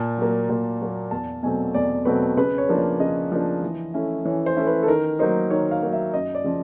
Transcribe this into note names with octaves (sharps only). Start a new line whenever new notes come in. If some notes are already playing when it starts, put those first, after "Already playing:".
Already playing: A#2 A5
F#3 A#3
A#2
F#3 A#3
E2 A5
B2 F#3 A3 C4 G#5
E2 D5
B2 F#3 A3 C4 B4
C#3 B4
C#5
F3 A#3 D4
D5
C#3 D#5
F3 A#3 D4
E3
A3 C#4 E4
E3 C#5
C5
A3 C#4 E4
B4
A4
D#3 A#4
F#3 A#3 D#4 C5
D#3 C#5
F5
F#3 A#3 D#4
E5
F#2 D#5
D5
C#3 F3